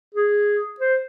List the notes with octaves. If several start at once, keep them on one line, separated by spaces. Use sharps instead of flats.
G#4
C5